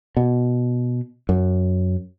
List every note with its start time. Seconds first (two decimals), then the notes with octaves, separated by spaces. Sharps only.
0.17 B2
1.29 F#2